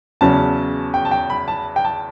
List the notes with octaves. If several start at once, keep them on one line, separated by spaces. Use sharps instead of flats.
E2 C#3 F#3 C#4 A5
G5
A5
G5
B5
A5
G5
A5